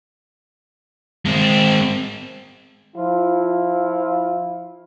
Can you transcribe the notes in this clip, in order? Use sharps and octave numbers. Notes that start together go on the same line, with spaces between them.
G#3 C4
F3 E4 F4